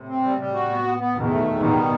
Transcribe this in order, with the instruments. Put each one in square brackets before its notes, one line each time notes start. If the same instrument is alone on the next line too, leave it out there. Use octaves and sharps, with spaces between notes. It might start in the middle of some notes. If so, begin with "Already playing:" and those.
Already playing: [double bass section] A2 C3
[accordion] C4
G3
G3
F#4
B3
B3
B3
[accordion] E2 [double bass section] B2 D#3
[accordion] A3
E2
[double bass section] B2 D#3 [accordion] G3
[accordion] B3